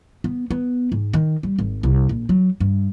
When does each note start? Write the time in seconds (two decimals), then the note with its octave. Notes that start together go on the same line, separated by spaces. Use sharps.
0.24 B3
0.51 B3
0.92 G#2
1.13 D#3
1.43 G3
1.59 G#1
1.83 C2
2.09 A#1
2.29 F#3
2.60 G2